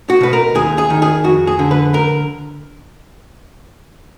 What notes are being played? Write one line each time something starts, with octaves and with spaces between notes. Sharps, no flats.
F#4
B2 B4
A#4
D#2 G#4
G#4
D#3
G#4
F2 F#4
G#4
D3
B4
A#4